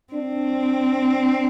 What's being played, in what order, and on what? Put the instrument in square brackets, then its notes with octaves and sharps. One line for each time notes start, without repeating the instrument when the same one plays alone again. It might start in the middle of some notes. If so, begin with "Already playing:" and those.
[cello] C4 [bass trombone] D4